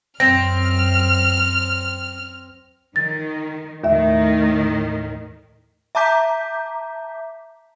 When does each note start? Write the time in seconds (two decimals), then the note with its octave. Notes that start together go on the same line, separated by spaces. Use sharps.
0.20 F#2 C4 F6 A#6
2.96 D#3 A6
3.84 D#2 A2 D#3 E5
5.95 E5 A5 A#5 D6 G6 B6